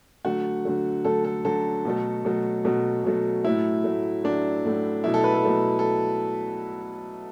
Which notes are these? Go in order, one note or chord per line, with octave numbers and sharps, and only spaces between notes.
D3 F#3 A3 F#4
D3 F#3 A3
D3 F#3 A3 A4
A4
D3 F#3 A3 A4
B2 F#3 A3
B2 F#3 A3
B2 F#3 A3
B2 F#3 A3
A2 F#3 A3 E4
A2 F#3 A3
A2 F#3 A3 D4
A2 F#3 A3
B2 F#3 A3 E4
A4
B4
A4
B2 F#3 A3
A4